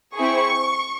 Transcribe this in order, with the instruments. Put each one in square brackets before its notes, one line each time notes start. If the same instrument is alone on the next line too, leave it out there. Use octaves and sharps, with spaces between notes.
[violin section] C4 E4 G#4 C#6